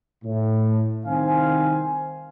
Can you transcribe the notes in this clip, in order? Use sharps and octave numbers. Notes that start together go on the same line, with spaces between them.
A2
C2 D#3 C4 F5 G#5